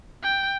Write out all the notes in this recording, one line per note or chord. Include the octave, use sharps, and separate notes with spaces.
G5